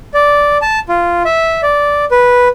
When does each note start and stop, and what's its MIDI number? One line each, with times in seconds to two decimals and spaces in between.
0.14 0.57 74
0.62 0.79 81
0.89 1.23 65
1.25 1.61 76
1.63 2.05 74
2.11 2.48 71